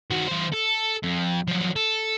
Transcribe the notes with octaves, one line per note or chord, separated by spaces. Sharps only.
D#3 F#4
E3 C5
A4
F2
F3 F#3
A4